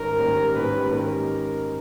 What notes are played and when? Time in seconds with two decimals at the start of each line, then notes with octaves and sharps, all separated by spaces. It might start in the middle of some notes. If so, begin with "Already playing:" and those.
Already playing: G#2 D#3 G3 C#4 G4 A#4
0.19 G#2 D#3 G3 C#4 G4
0.55 G#2 D#3 G3 C#4 G4 B4
0.90 G#2 D#3 G3 C#4 G4 A#4